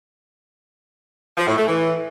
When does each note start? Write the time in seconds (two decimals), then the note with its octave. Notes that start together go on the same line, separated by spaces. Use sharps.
1.38 F3
1.47 A2
1.57 A3
1.67 E3